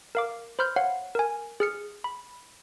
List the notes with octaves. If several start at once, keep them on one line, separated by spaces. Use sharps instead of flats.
A#4 F5 D6
C5 B5 C6 F6 G6
C#5 F5 F#5
A#4 G#5
G#4 F6 C#7
B5